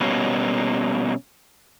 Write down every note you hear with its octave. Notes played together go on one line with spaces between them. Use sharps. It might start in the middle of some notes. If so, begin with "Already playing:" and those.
B2 G3 A#3 C#4